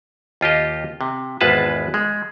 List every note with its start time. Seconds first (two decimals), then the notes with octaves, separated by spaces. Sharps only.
0.41 D#2 F4 G4 D#5
1.01 C3
1.41 G#1 E2 G#3 F4 B4 A5
1.94 G#3